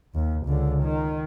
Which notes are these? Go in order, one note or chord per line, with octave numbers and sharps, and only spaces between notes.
D#2
C#2 D3
D#3